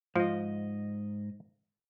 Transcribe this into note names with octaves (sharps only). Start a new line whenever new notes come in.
G#2 F3 D#5